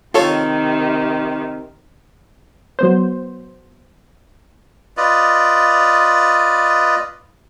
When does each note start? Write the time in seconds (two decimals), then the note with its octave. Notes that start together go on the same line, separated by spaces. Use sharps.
0.14 C3 D#3 F4 A4 C#5
2.79 F#3 B3 C5
4.97 F4 B4 D5 D#5